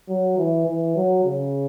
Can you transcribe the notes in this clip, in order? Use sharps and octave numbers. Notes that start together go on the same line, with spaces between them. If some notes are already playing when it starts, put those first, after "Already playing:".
F#3
E3
E3
F#3
C#3